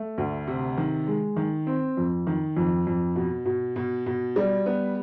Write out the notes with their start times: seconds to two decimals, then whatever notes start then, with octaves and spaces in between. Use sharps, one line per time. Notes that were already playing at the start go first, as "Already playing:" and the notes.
Already playing: A3
0.18 D2
0.47 C3
0.77 D#3
1.07 G#3
1.36 D#3
1.67 C4
1.97 F2
2.27 D#3
2.57 F2
2.87 F2
3.16 B2
3.45 B2
3.76 B2
4.06 B2
4.36 G3
4.66 B3